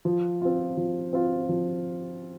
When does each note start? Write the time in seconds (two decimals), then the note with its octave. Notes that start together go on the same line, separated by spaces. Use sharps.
0.05 F3
0.41 C4 F4
0.77 F3
1.13 C4 F4
1.49 F3